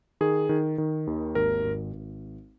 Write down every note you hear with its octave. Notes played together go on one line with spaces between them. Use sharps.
D#3 G#4
D#3
D#3
D#2
G#1 A#4
G#1
G#1